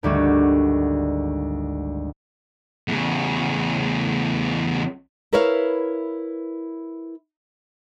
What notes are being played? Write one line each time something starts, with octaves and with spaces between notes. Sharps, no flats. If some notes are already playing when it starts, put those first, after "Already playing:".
G#1 D2 G3 F#4
E2 C#3
E4 A#4 B4 C#5 E5 F5